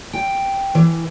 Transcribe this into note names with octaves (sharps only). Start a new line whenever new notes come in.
G5
E3